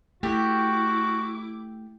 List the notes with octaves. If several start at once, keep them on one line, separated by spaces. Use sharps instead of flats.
A3 E4 F#4 G4 D6